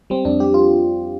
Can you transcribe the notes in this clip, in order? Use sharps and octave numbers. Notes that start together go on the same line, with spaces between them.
G3 C4
F2 D4
G3 G4
F4